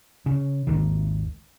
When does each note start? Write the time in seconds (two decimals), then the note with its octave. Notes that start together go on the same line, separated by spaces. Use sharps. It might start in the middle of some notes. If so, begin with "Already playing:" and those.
0.26 C#3
0.67 G#1 D#2 D#3